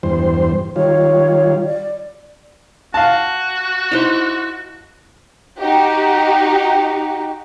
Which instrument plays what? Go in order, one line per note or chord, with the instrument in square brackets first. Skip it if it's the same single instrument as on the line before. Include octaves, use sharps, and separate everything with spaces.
[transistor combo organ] E2 G2 C5
[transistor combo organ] D#3 G3 F4 [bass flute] C#5
[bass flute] D5
[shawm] F#4 [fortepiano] F5 A5
[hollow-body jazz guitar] D#4 E4 C5
[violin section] D#4 F#4 G4